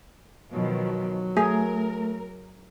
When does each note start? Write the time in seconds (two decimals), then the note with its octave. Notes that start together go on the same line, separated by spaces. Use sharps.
0.52 B2 D#3 F3 F#3
1.37 A3 G#4 A#4